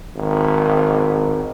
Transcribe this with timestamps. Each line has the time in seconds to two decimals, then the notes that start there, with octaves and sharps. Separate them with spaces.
0.16 G#1